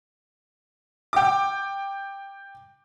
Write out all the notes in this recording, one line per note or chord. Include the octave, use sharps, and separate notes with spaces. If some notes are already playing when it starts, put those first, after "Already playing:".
G5 D6